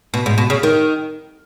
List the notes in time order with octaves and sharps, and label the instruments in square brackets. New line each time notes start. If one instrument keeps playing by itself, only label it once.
[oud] B2
G#2
B2
C#3
D#3